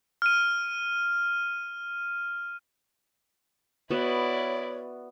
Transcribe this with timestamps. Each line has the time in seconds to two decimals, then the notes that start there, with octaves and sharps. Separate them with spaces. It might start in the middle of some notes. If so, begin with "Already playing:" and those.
0.22 F6 D#7
3.91 B3 E4 F#4 C#5 D5